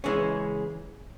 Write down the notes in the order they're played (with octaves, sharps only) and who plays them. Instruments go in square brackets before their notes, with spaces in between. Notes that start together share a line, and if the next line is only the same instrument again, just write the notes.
[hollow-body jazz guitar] C#3 E3 G#3 C#4